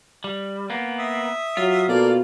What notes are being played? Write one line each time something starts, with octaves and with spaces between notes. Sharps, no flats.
G3
A#3 B3
E5 D#6
F#3 F4
B2 A#3 A4 D5